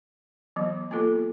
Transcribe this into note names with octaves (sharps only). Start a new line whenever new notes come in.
E3 F#3 B3
A#3 B3 F4 A4